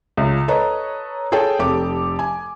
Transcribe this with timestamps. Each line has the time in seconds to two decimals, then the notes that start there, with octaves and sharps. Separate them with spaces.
0.17 C#2
0.48 A4 B4 C#5 D#5 A#5
1.32 G#4 A4 C#5 G5
1.59 F1 G4 A4 D6
2.19 G#5